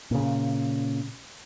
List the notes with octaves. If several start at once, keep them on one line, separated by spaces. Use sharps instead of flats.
A#2 C#3